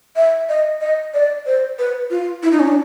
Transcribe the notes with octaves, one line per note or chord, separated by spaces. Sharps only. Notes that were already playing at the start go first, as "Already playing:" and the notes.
E5
D#5
D#5
D5
C5
B4
F4
E4
D#4
C#4
D4